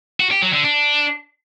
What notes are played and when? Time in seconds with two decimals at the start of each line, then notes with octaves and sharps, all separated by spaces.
0.20 F#4
0.31 G4
0.42 F#3
0.53 D3
0.64 D4